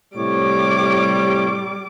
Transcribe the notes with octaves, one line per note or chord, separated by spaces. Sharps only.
A2 C3 G3 C#5 D6